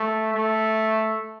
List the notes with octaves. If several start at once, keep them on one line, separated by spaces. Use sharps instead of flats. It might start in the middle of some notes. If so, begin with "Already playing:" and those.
Already playing: A3
A3